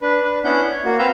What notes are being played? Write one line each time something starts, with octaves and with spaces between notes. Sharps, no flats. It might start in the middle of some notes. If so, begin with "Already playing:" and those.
D4 B4
D4 B4
B3 C#4 D4 E4 F#5 G6
C#5
A#3 F#4
C4 B4 F5 A#5 E6 G6